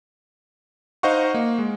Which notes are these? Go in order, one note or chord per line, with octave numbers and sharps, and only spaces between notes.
D#4 C5 D#5 F5 F#5 C#6
A#3
G#3